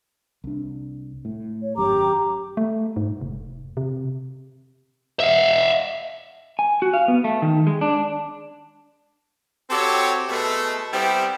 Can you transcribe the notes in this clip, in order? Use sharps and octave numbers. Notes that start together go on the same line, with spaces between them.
C2 D4
A2
C#5
G#1 F#2 G4 A#5 D6
A3
G#2
F1
C3
E5 F5
G#5
F#4
F5
B3
A3
D#3
G#3
D4
C4 F#4 G4 A4 C#5
B2 G#3 A3
G3 B3 C4 E4 G4